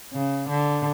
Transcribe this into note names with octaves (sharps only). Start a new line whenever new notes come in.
C#3
D3